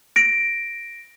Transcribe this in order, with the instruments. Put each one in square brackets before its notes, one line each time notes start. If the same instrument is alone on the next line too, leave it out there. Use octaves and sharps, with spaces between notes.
[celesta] A#6 D7